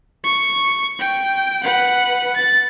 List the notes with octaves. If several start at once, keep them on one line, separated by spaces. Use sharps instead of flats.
C#6
G5
B4 F#5
A6